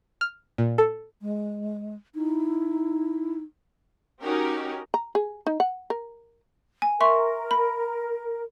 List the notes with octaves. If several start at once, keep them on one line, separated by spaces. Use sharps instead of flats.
F6
A#2
A4
G#3
D#4 E4
C#4 D#4 F#4 G4 A#4
A#5
G#4
D#4
F#5
A#4
G#5
A#4 E5 C6 C#6
B5